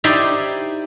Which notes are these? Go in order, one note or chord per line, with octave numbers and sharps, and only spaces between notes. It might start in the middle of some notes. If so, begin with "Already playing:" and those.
D#4 E4 G4 C5 D5 C6